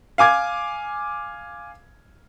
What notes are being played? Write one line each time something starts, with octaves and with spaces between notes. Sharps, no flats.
F5 G#5 D6 G#6